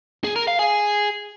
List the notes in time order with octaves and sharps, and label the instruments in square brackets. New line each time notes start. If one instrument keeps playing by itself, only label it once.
[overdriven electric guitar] G#4
A#4
F5
G#4